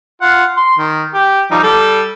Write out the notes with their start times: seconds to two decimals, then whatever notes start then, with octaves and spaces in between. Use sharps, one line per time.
0.22 F4 F#5
0.57 C6
0.78 D#3
1.14 G4
1.51 F3 G3 D#4
1.63 G3 A4